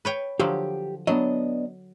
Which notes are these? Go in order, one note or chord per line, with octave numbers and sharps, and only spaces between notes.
B4 C#5 G5
D3 F3 F#3 G4
F#3 B3 D4 D#5